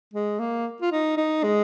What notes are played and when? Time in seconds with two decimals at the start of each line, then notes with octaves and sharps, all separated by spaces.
0.14 G#3
0.39 A#3
0.82 F4
0.92 D#4
1.17 D#4
1.43 G#3